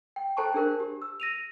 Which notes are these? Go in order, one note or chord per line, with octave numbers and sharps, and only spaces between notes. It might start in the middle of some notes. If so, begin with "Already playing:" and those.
G5
A4 C5 G5 A5 A#5 C#6
D4 G#4 A#4 C5
G4
E6
A#6 D#7 F7